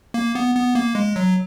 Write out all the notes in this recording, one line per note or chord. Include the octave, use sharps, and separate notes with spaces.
A#3
B3
B3
A#3
G#3
F#3